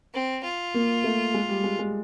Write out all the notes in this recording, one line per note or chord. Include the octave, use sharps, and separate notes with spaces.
C4
F4
A#3
A3
G#3
G3
G#3
G#3